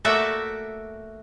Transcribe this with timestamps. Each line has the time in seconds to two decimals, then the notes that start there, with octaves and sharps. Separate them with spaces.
0.05 A3 A#3 F#4 D5 E5